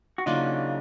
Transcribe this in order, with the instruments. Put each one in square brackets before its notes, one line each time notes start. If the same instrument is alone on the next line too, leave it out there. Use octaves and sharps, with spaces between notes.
[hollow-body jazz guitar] F#4
[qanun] C#3 F#3 A#3 D4 [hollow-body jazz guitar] D#4 F4